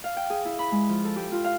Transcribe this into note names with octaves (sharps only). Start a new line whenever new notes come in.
F5
G5
G#4
E4
B5
G#3
F3
A4
G4
F4
F5